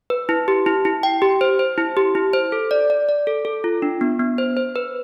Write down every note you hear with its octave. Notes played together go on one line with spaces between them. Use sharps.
B4
E4
G4
E4
E4
G5
G4
C5
C5
E4
G4
E4
C5
A4
D5
D5
D5
A4
A4
F4
D4
B3
B3
C5
C5
B4